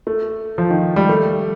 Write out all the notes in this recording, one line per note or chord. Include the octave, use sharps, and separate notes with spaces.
A3
F3
D#3
G3
A3